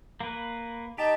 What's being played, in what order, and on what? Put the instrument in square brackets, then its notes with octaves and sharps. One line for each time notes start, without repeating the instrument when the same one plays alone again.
[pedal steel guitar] A#3 B4
[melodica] D#4 A5 [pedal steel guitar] G4